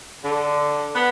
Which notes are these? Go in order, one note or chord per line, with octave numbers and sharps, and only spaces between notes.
D3
B3